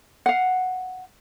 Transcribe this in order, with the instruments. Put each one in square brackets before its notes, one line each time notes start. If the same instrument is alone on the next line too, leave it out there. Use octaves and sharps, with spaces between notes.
[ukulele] F5 F#5